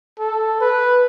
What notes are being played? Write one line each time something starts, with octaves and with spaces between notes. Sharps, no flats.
A4
B4